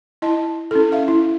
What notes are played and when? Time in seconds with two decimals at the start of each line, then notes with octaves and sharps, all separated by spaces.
0.22 E4 D#5 A5
0.71 C#4 E4 A4
0.92 E5 F5
1.08 E4